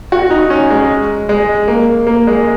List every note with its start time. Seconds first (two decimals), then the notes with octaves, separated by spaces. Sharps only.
0.12 F#4
0.31 D#4
0.50 C#4
0.71 G#3
1.29 G#3
1.68 A#3
2.07 A#3
2.27 G#3